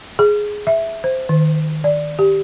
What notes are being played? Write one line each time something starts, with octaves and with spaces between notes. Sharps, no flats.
G#4
E5
C5
D#3
D5
G4